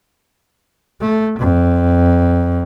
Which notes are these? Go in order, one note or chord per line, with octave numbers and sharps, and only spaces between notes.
A3
F2